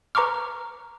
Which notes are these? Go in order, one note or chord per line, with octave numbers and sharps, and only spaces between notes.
B4 A#5 C#6 D6 F6